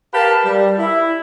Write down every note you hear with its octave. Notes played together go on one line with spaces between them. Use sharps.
G4 A#4 B4 F5 A5
G3
E4